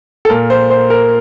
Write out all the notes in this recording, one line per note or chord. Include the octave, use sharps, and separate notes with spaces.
A4
A#2 A#4
C5
C5
A#4